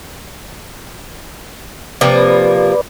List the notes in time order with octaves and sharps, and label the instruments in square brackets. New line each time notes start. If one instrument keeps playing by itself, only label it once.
[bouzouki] C3 F3 A#3 [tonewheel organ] B4 D5